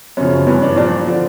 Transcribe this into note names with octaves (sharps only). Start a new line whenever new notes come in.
F#2 C#3 F3 C#4
G2 E3 C#4
D4
A#2 F3 D4
D3 F3